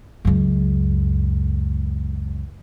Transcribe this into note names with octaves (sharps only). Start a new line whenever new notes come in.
C#2 F#2